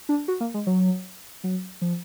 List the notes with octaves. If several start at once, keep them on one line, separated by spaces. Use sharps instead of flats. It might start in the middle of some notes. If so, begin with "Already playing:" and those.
D4
F#4
A#3
G#3
F#3
F#3
F3